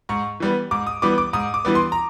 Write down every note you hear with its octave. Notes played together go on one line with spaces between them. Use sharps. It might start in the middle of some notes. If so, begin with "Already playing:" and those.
G#2 C#6
E3 G3 B3
G#2 D6
D#6
E3 G3 B3 D6
D6
G#2 D#6
D6
E3 G3 B3
C6
A#5